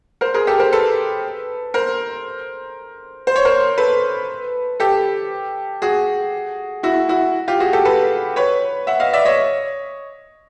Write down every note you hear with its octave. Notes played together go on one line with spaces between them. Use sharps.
A#4 C5
G#4 A#4
G4 A4
A#4 C5
A4 B4
A#4 C5
C5
C#5
A#4 C5
A4 B4
G4 A4
F#4 G#4
E4 F#4
E4 F#4
F4 G4
F#4 G#4
G4 A4
A4 B4
B4 C#5
E5 F#5
D#5 F5
D5 E5
C#5 D#5